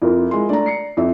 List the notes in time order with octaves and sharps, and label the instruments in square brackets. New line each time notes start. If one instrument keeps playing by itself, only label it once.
[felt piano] F2 [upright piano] E4 F4 A#4
[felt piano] G#3 C6
[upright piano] A3 D4 [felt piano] D5 A#5
[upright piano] C7 C#7
[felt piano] F2 E5